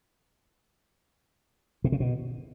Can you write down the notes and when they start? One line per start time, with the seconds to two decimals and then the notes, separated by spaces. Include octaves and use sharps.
1.84 B2
1.92 C#3
2.00 B2